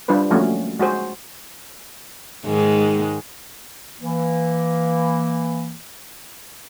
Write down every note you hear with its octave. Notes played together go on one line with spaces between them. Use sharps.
G3 D4 F4 B4 C5
F3 F#3 A3 A#3 C#4 F#4
G#3 F#4 G#4 C5
G#2 D#3 G#3
E3 A#3